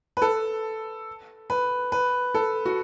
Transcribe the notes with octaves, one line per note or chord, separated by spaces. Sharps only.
B4
A4
B4
B4
A4
F#4